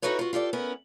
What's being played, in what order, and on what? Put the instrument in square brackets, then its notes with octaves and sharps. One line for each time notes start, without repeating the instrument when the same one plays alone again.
[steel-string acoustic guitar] D#4 E4 F#4 A4 B4 C#5
F4 F#4
F4 G4 A4 D5
B3 C#4 E4 A#4